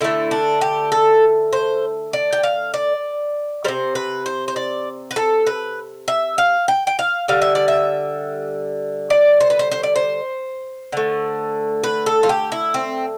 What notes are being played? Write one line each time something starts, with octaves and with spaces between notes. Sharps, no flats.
D3 A3 E4
D4
G4
A4
C5
D5
G5
F5
D5
C3 G3 C5
B4
C5
C5
D5
B4
A4
B4
E5
F5
G5
G5
F5
D3 G3 F5
E5
D5
E5
D5
C5
B4
C5
C5
D5
C5
D3 A3
B4
A4
F4
G4
E4
C4